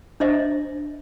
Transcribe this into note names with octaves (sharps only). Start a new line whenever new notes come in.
D4 C5 D#5 E5